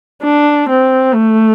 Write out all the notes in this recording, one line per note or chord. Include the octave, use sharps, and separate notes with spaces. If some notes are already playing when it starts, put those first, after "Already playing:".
D4
C4
A3